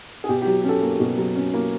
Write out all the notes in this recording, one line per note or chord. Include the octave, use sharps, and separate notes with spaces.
G#4
B2 G4
G4
F#3
C#4 A4
A#3
B2
F#3
C#4
A#3